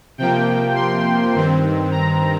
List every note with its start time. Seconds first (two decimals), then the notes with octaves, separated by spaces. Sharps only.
0.18 C3 F3 A#3 G5
0.75 C6
1.34 G2 D#3 C4
1.91 A#5